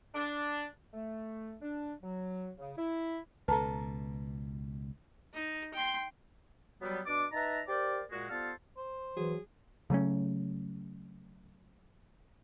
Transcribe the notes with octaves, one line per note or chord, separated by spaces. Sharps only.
D4
A3
D4
F#3
C#3
E4
C#2 B2 A4 B4 A5 A#5
D#4
G5 C6
F#3 G3 B3
B2 D4 D5 D6
D#4 B4 E5 A5 A#5
G4 A#4 C5 D5
A#2 G#3 F#4
G3 B3 F4 A4 C5 F5
C5
E3 F#3 G#4
C#3 F#3 A3 C#4